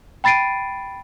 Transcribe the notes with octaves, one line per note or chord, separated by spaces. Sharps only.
G5 B5 A6 C7 D7 D#7